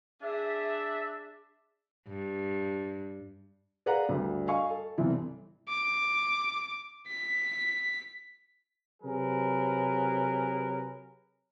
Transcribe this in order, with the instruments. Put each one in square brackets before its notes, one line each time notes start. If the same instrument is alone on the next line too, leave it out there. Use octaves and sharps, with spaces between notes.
[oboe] D4 [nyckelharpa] G#4 [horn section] E5
[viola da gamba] G2
[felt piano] G#4 B4 D5 F5 F#5 A#5
D2 G2
D#5 F5 G#5 C#6
A4
G1 C2 C3 E3
[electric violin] D6
B6
[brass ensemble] C3 F#3 G#4 A#4 B4